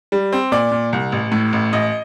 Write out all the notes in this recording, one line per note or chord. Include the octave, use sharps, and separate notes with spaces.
G3
C4
A#2 D5
A#2
C2
A1
A2
A1
A1 D#5